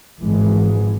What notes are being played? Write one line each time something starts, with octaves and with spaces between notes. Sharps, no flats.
G#1 E3 G#3